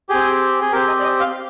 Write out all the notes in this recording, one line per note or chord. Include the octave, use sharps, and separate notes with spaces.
C4 G4 G#4
G#4
C4 G4 A#4
D#5
D5
D#5
F5